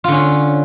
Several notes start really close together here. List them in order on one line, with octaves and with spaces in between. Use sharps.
F4 D3 C#4